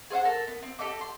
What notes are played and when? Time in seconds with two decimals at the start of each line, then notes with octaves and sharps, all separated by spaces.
0.10 G#4 C5 F5 F#5
0.24 A4 A#4 A5
0.47 B3
0.63 C4
0.79 G4 A4 D#5 D6
1.01 C6